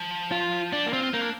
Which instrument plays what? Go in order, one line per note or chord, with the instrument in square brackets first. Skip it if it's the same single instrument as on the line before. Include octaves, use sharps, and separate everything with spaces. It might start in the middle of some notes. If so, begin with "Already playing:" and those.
Already playing: [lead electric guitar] F3
[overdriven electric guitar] F4
[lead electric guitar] G3 [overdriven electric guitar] D4
[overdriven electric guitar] A#3
[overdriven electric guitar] C4 [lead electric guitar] F4
[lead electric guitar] F4
[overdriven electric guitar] A#3 [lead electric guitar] D#4
[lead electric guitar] D4